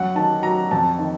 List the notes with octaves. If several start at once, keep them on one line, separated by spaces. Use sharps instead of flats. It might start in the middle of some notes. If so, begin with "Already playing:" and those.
Already playing: F#2 F#5
D#3 A5
F#3 A#5
F2 A5
D#3